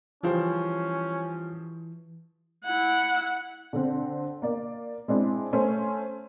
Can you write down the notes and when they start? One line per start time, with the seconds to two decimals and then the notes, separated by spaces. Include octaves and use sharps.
0.23 C#3 E3 F3 G3 C#4 F4 G4 C5
2.65 E4 F#5
3.73 D3 C4
4.42 A#3 D5
5.08 G#3 C4 D4 E4
5.53 A3 C#4 C5